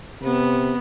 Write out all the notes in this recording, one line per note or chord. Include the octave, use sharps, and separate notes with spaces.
C3 B3